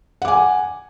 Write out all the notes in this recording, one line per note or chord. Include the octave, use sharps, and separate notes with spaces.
F#5 G#5 D6